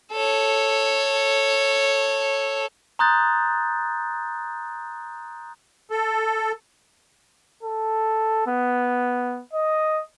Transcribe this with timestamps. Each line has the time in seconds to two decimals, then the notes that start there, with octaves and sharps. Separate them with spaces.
0.12 A4 C#5
2.99 A#5 C6 D#6 F#6 G6 A6
5.91 A4
7.63 A4
8.47 B3
9.54 D#5